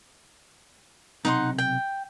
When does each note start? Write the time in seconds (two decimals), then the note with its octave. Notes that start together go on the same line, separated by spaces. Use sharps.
1.25 B1 C3 D#4 F#5 C6
1.58 G5